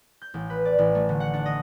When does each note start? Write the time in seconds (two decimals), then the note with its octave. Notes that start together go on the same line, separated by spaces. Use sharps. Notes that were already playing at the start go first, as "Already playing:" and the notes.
0.22 G6
0.34 A1
0.50 B4
0.65 D5
0.78 A1
0.95 A3
1.09 D3
1.20 F#5
1.34 D4
1.46 D#5